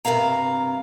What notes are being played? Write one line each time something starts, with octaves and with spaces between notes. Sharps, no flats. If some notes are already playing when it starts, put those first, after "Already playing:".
G2 C3 A#3 A#4 F5 A#5